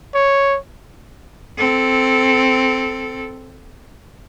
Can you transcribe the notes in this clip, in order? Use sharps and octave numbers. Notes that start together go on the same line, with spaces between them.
C#5
C4 A4